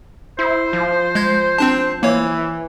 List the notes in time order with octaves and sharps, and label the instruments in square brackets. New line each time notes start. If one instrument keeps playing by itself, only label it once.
[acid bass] E4 [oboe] C5
[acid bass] F3
[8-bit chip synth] G#3 G6 G#6
C4 D4 A5
[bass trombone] E3 [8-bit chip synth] A#3 C#5